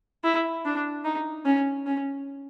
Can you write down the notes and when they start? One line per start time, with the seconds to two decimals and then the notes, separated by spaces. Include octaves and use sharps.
0.24 E4
0.65 D4
1.05 D#4
1.45 C#4
1.86 C#4